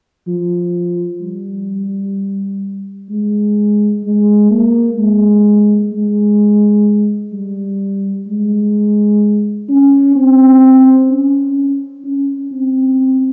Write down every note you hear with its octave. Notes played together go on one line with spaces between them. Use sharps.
F3
G3
G#3
G#3
A#3
G#3
G#3
G3
G#3
C#4
C4
C#4
C#4
C4